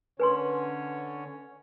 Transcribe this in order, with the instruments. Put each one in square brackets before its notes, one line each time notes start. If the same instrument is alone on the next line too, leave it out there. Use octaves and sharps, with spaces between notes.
[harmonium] D3 C#4 C#5 [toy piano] B4 G#5 C6